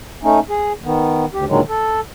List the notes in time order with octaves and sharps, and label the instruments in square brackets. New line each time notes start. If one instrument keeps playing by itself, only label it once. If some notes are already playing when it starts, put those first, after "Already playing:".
[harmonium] A3 C#4 D#4
G#4
D#3 B3
D2 G4
A#2 D3 D#3 F#3 G#3
A4